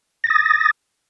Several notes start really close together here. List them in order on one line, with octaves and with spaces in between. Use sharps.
A#6 A6 D#6